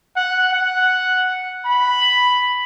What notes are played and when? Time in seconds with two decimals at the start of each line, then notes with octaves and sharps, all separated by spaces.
0.16 F#5
0.53 F#5
1.65 B5